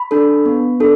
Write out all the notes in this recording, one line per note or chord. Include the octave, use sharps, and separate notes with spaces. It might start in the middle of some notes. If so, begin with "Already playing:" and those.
Already playing: B5
D4 A4
B3
D4 A4